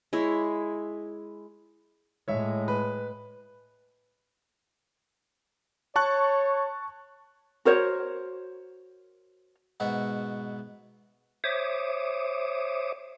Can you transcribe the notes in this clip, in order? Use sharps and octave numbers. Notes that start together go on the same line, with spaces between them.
G#3 E4 C#5
A2 G#3 C#5 E5
B4
C#5 A5 C#6 F#6
F#4 A#4 C5 C#5
G#2 B2 F#4 E5
C5 C#5 E5 D6 D#6